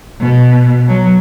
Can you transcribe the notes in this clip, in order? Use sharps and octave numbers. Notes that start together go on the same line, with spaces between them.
B2
F#3